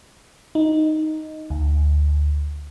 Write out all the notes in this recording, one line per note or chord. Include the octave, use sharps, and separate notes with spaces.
D#4
D2